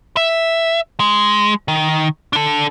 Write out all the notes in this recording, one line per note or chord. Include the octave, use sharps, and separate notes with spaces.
E5
G#3
D#3
D4 A4